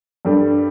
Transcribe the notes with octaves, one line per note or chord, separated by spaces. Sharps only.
G2 G3 D4 A4